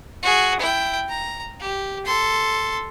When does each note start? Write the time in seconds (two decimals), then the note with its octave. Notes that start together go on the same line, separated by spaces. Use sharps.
0.23 F#4 G#4
0.60 E4 G5
1.09 A#5
1.60 G4
2.06 A4 C6